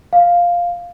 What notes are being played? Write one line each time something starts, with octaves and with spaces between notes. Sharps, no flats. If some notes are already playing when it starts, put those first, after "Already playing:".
F5